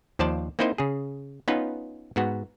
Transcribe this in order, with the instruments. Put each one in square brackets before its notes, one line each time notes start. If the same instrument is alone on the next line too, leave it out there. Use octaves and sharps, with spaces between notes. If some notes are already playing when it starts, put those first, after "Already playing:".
[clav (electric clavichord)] D#2 F3 C5 D5 A5
A#3 C4 D#4 E4 C5 D#5
C#3 G#4
B3 C#4 D#4 F4 B4
G#2 B3 F#4